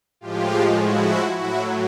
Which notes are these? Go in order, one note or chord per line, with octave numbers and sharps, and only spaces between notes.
A2 F3 G#3 F4 G4
E4 F#4
A2 F#3 E4 F#4